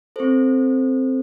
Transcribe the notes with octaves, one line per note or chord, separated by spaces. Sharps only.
C4 A4 C5